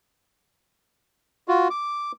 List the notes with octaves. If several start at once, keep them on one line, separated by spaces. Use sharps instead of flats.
F4 F#4
D6